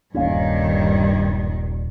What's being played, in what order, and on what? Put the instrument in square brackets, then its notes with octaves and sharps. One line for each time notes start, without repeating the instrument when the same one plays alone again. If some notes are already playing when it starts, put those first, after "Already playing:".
[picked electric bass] D#1 A#3 C#4 [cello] G2 D#3